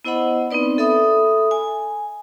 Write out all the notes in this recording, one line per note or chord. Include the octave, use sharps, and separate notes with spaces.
B3 E4 C5 D#5 F#5 B5
B3 C4 D#4 B4 D5
A4 E5 B5 D#6
G#5